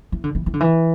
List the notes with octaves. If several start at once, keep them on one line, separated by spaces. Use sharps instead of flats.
E3
D3
E3
E3
D3
E3